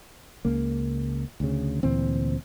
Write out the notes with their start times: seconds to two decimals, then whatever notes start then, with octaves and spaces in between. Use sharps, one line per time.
0.45 C#2 C#3 A#3
1.40 D2 C#3
1.83 D2 A#2 E3 C4